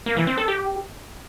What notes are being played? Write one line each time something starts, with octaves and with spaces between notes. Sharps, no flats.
A#3
E3
C4
A4
G4